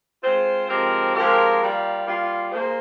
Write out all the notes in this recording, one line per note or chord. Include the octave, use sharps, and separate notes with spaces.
G#3 C4 F4 C5
F3 G#3 C4 G4 A#4
F3 G#3 C4 G4 A#4
G3 A#3 F4
G3 A#3 F4
A#3 F4 G#4 C5